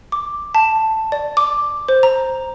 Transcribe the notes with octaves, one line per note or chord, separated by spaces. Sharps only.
D6
A5
D5
D6
C5
A#5